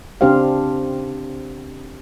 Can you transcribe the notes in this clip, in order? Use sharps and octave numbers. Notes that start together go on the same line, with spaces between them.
C#3 C4 D4 G4 C5 F5